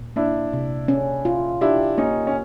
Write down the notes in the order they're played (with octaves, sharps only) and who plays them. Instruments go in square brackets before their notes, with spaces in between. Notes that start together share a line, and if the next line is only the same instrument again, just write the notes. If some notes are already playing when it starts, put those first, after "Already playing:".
Already playing: [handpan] A#2
[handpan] A#3 [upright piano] D4 E4
[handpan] C3
C#4
F4
[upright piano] D4 E4 [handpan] G4
[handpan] A#3 [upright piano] C#4 D#4
[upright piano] C#4